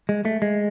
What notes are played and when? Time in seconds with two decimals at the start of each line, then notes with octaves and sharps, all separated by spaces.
0.09 G#3
0.25 A3
0.42 G#3